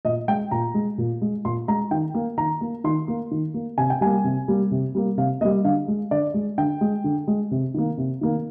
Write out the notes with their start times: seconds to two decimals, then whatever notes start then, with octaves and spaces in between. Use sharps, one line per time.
0.05 A#2 D#5
0.28 G#3 G5
0.51 A#2 A#5
0.74 G#3
0.98 A#2
1.22 G#3
1.45 A#2 C6
1.68 G#3 A#5
1.91 D#3 G5
2.14 A#3
2.37 D#3 A#5
2.61 A#3
2.84 D#3 C6
3.08 A#3
3.31 D#3
3.54 A#3
3.78 C3 G#5
3.90 G5
4.01 G3 A#3 G#5
4.24 C3
4.48 G3 A#3
4.71 C3
4.95 G3 A#3
5.18 C3 F5
5.41 A#3 D#5
5.45 G3
5.65 D3 F5
5.88 G#3
6.11 D3 D5
6.34 G#3
6.58 D3 G5
6.81 G#3
7.04 D3
7.28 G#3
7.51 C3
7.74 D#3 A#3
7.98 C3
8.21 D#3 A#3